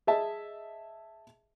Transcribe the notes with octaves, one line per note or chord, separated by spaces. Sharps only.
G#4 D#5 E5 A5